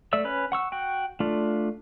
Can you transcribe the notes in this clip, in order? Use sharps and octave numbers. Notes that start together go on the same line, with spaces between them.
A3 D5 E5 E6
C#4 B4
F#5 C#6 E6
F#4 G5
A3 D4 F4